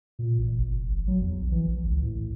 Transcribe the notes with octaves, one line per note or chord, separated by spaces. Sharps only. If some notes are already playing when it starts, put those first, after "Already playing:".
A#2
A1
F1
A1
F#3
E2
A#1
E3
A1
C#2
A2